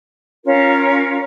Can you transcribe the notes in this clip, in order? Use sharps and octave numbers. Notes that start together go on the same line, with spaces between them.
C#4 F4 A#4